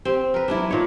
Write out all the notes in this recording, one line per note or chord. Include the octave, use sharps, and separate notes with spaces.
C4 G4
A#4 B4
E3 F#3 D4 E4
A#2 D#4 C#5